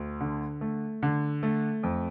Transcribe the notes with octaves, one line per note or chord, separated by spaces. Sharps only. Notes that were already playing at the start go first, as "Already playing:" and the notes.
Already playing: D2
D3
A3
D3
A3
F2